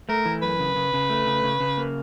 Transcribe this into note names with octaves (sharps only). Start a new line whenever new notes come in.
A3 A#4
E3
F#2 B4
C#3
C#3
C#3
A3
C#3
C#3
C#3
A#3